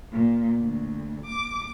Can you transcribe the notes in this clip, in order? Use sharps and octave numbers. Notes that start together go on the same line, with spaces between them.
A#2
D2
D6